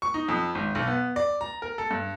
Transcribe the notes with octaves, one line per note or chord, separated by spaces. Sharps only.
C#6
D#4
F2
G#1
B1
B3
D5
A#5
A#4
A4
G2